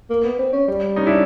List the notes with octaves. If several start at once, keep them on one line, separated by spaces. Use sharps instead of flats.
A#3
B3
C4
C#4
G3
C#4 D#4
D4 E4